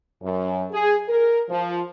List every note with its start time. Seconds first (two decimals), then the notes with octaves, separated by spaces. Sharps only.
0.23 F#2
0.71 G#4
1.09 A#4
1.50 F3